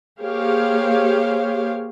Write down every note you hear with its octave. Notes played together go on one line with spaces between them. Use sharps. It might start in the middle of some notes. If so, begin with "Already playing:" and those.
A#3 G4 G#4 C5 C#5 F5